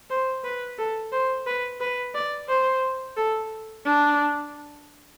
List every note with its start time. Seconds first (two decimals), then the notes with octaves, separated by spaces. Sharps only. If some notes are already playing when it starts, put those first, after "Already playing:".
0.10 C5
0.44 B4
0.78 A4
1.12 C5
1.46 B4
1.81 B4
2.14 D5
2.48 C5
3.17 A4
3.85 D4